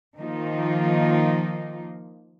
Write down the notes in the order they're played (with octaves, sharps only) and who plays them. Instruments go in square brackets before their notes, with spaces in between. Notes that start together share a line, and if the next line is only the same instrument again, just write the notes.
[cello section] D#3 F3 A#3 D#4 F4